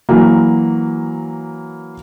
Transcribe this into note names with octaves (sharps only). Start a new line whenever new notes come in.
E3 F#3 A#3